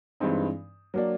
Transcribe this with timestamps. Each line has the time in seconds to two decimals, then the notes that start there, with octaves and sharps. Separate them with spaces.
0.20 G2 E3 G#3 C4 D#4
0.94 F#3 A#3 D4